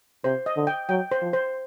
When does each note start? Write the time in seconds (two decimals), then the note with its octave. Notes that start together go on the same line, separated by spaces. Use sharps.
0.24 C3 C5
0.46 D#5
0.56 D3
0.67 G5
0.89 F#3 G5
1.12 C5
1.22 F3
1.33 C5